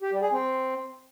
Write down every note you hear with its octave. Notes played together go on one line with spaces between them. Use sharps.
G4
G3
G#4
C4